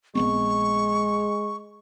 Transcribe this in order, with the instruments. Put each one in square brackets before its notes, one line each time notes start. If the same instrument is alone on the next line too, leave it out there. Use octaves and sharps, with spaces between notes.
[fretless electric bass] A#1 B3 C4 [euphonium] G#3 [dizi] C#6